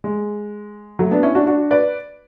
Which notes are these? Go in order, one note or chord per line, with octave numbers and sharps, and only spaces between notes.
G#3
F#3 A3
B3 D4
C#4 E4
D4 F#4
D4 F#4
B4 D5